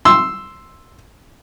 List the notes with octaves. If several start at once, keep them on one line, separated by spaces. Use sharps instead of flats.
C6 E6